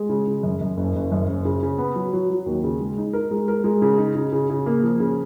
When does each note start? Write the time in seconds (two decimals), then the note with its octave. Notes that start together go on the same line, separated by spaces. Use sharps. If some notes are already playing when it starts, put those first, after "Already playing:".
Already playing: G#3
0.09 C#3
0.27 C#3
0.43 F#2
0.61 F#2
0.77 F#1
0.95 F#1
1.12 F#2
1.28 F#1
1.45 C#3
1.63 C#3
1.78 B3
1.96 F#3
2.13 F#3
2.30 F#3
2.46 D#2
2.63 C#3
2.80 G#3
2.98 D#4
3.13 A#4
3.31 G#3
3.48 A#4
3.64 G#3
3.82 C#3
3.98 D#4
4.15 C#3
4.32 C#3
4.50 C#3
4.66 A#3
4.83 F3
5.00 C#3